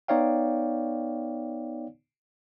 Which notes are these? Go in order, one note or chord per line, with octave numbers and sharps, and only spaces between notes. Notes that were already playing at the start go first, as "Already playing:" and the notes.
B3 D#4 C#5 D5 F5 G5